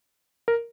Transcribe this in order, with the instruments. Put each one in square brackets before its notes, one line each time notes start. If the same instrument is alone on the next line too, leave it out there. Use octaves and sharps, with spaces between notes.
[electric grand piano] A#4